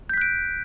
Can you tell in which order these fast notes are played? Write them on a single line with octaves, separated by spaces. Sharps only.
G6 B6 F#6 D7